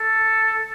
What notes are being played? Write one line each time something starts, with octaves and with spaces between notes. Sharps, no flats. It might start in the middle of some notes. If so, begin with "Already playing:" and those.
Already playing: A4